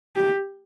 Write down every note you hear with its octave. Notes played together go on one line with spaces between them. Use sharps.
G4